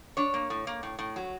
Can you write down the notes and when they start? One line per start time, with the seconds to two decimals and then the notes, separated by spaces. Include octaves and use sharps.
0.17 D4 C#5
0.34 A#3
0.50 A2
0.67 A#3
0.83 A2
0.99 A2
1.16 F#3